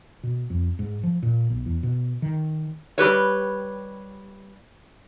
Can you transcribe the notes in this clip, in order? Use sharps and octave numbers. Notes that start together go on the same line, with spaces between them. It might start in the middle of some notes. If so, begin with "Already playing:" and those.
B2
F2
G#2
F3
A#2
B1
E2
B2
D#3
G3 G4 B4 C#5